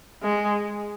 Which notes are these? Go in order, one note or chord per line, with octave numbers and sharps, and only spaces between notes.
G#3